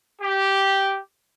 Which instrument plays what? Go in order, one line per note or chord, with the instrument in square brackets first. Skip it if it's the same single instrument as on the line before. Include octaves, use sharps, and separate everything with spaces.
[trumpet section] G4